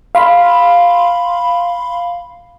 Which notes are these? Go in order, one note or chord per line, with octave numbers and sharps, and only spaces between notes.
F5 B5 C6